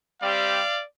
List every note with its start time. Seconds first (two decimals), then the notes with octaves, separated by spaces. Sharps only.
0.21 G3 C4 G4 D5 F5